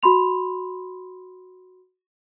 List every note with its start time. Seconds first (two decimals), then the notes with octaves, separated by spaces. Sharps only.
0.03 F#4 B5 C6 F7